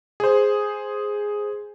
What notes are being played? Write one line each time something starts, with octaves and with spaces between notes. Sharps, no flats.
G#4 C5